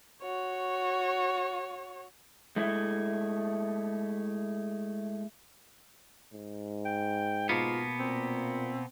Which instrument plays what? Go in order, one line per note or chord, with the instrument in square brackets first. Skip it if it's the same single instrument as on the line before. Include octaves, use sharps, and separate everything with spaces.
[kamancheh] F#4 C#5
[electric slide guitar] G#3 A3 E4
[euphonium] G#2
[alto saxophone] G5
[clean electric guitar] B2 A#3 B3 [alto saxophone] F4
[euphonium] A#2 [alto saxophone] C4